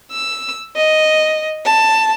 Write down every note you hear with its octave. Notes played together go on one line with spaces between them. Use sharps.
E6
D#5
A5